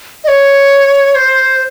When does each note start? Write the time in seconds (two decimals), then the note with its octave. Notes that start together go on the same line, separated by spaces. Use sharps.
0.24 D#5
0.28 C#5
1.15 C5